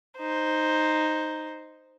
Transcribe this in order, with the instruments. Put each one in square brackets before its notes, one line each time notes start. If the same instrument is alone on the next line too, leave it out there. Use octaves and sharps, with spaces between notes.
[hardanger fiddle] D#4 C5